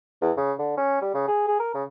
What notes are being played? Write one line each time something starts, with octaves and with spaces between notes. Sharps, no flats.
E2
C#3
D3
C#4
G3
C#3
G#4
G#4
A#4
C#3